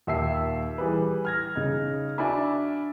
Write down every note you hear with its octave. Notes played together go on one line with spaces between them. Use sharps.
D#2 A#2 E5 A5 E6 C7
E3 G3 G#4 B4
F6 G#6 A#6
C#3 D#4
D4 F#4 E5 G#5 B5